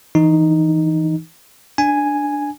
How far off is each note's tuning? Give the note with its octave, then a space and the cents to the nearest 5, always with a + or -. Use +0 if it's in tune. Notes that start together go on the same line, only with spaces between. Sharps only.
E3 -10 D#4 +0
D4 +0 G#5 +0